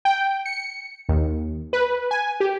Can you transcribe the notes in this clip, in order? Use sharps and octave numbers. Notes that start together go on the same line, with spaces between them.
G5
C#7
D#2
B4
G#5
G4